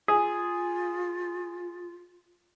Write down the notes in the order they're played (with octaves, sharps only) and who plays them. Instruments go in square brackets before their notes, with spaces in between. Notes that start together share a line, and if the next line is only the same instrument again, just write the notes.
[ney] F4 [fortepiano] G#4